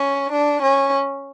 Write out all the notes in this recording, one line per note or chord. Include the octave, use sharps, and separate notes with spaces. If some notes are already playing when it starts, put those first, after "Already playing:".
Already playing: C#4
D4
C#4